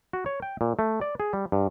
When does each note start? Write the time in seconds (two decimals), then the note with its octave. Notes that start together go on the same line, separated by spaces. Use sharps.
0.13 F#4
0.26 C#5
0.42 G5
0.61 A#2
0.79 A3
1.01 D5
1.20 G#4
1.33 G3
1.52 G2